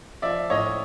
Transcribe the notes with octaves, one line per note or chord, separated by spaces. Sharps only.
F3 D5 E5
A2 C#5 D#5